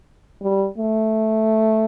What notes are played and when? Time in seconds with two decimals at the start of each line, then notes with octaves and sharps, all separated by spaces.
0.42 G3
0.78 A3